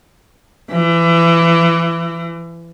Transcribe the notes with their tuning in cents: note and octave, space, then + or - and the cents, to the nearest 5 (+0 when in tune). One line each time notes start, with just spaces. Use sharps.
E3 +25